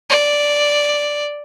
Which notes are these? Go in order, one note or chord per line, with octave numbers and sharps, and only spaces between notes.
D5